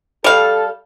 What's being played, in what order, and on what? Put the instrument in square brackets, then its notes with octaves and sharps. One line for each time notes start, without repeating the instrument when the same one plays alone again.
[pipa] G3 F5 [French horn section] A4